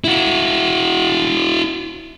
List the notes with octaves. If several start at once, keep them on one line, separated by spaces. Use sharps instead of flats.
E4 F#4